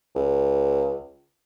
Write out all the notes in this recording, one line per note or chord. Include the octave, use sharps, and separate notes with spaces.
C#2